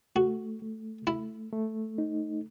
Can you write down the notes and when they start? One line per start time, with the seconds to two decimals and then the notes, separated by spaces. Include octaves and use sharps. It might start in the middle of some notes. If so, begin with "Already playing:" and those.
0.16 A3 F#4
0.62 A3
1.07 A3 E4
1.53 A3
1.98 D#4